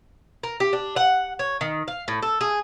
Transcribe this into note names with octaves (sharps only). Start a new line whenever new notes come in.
A#4
G4
D4
F#5
C#5
D#3
F5
A2
A4
G#4